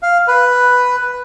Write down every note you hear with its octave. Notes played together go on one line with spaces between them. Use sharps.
F5
B4